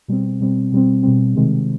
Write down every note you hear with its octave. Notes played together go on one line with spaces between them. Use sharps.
B2 G3 C4
B2 G3 C4
B2 G3 C4
B2 G3 C4
C3 D#3 G#3 C4